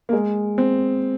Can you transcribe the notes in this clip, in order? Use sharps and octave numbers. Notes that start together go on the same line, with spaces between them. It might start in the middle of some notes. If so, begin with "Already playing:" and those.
A#3
G#3
C4